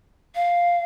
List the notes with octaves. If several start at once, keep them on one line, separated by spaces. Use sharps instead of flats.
F5